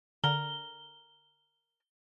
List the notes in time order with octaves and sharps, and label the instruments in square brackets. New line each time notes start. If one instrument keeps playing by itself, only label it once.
[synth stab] D3 [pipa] A#4 [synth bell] G7